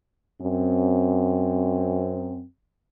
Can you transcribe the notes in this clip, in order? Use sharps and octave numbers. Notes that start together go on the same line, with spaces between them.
F#2 C4